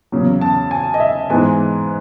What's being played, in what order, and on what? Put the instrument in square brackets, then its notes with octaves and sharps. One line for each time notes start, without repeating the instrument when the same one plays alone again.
[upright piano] E2 C#3 F#3
A5
G#5
D#5
E5
G#2 E3 G#3 B3 G#5